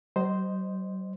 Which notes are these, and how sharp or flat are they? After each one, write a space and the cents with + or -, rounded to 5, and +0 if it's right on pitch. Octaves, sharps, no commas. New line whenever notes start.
F#3 +45 C5 +0 D#5 +0